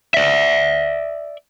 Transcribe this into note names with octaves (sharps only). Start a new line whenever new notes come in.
D5 E5